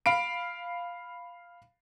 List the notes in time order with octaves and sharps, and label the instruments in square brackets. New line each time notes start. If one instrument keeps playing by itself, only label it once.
[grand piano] F5 B5 D7